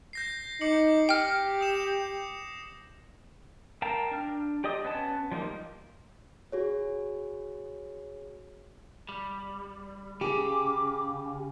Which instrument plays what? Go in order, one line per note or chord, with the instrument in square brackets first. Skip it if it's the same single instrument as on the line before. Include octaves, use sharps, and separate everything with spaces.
[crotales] G6 A#6 C7
[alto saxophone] D#4 [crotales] D6 C#7 F#7
[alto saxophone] G4 [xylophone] G5 F6
[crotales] D#6 E7
[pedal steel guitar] A#4 F5 G5 A5 A#5
D4 F6
G4 D5 D#5 D#6
B3 C#4 A5
F3 G3 A#3 D#4
[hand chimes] F#4 G#4 C#5
[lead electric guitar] G3
[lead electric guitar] C#3 [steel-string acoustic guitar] G4 G#4 [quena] D6